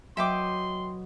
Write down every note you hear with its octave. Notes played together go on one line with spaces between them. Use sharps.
F#3 B4 D#5 E5 G5 C6 D6